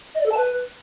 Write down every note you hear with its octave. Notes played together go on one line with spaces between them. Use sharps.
D#5
D5
A4
A5
B4